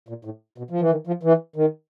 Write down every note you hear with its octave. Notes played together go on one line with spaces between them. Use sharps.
A#2
A2
B2
F3
E3
D#3
F3
E3
D#3